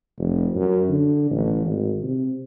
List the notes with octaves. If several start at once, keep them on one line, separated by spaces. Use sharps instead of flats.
F1
F#2
D3
A1
G#1
C3